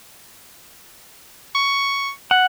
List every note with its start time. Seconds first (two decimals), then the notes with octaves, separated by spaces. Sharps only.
1.55 C#6
2.31 F#5